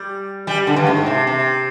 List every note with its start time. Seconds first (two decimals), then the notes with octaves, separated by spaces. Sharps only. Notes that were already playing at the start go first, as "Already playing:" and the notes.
Already playing: G3
0.47 G3
0.67 D3
0.76 G2
0.87 G#2
1.06 C3
1.27 C3